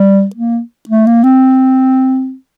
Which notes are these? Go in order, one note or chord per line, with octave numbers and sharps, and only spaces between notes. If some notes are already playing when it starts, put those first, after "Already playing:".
Already playing: G3
A#3
A3
A#3
C4